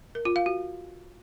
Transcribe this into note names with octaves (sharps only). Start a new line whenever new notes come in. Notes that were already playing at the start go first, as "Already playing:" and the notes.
A#4
F4
F5
F#4